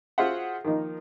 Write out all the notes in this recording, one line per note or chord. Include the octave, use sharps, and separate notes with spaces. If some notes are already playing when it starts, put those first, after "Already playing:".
F4 F#4 G#4 C5 E5 F#5
D#3 F3 A#3 D#4